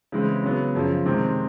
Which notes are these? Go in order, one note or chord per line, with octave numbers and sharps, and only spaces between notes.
C#3 E3 G#3 C4
C#3 F#3 B3
F#2 C#3 F3
C3 D#3 G#3 C4